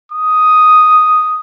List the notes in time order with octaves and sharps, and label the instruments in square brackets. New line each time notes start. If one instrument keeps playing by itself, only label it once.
[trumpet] D#6